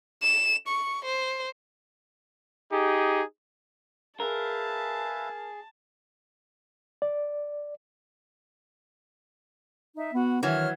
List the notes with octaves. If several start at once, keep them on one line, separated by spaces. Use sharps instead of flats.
E7
C#6
C5
D#4 G4 G#4
G#4 A#4 B4 E5 F5 A5
D5
D#4 E5
B3 F#4
D#3 E3 F#3 C#5 F6